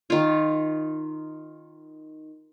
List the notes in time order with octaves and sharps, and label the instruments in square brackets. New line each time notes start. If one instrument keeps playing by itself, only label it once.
[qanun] D#3 F4